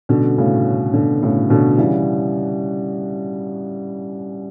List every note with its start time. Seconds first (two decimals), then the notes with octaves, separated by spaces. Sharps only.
0.09 B2 D3 G3 C#4 F#4 A4
0.38 A2 C#3
0.94 B2 D3
1.23 A2 C#3
1.50 B2 D3
1.78 C#3 E3 G3 C#4 G4 D5 F#5